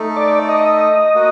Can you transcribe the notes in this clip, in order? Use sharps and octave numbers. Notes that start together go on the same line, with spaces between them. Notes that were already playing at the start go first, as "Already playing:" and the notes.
Already playing: A3 D#4 A4
D5
D#5
A#3 F#4